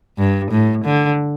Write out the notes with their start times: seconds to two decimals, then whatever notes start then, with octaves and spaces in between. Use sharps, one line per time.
0.18 G2
0.52 A2
0.85 D3